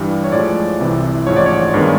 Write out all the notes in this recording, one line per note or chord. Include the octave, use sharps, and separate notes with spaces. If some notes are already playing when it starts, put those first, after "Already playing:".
Already playing: G2 E3 G3
C#5
A2 F3 G#3 D5
C2 C3 E3
A1 G#2 F3 C#5
D5
C#5
G2 D#3 G#3 B3